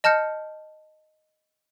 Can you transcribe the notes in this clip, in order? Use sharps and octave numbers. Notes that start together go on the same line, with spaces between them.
D#5 A5 F6 G6 C#7